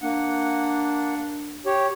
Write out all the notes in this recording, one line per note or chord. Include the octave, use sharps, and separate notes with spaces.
A#3 D4 F#5
G4 C#5